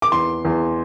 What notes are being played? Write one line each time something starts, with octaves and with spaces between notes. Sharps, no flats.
D6
E2 C6
E2